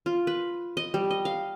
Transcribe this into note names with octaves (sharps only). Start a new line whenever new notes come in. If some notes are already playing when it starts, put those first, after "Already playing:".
F4
B4
D#5
G3
D#5
F5